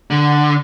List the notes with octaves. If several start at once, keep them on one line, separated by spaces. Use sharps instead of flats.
D3